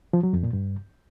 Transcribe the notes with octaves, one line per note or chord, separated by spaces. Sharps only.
F3
F#3
F2
A#2
G2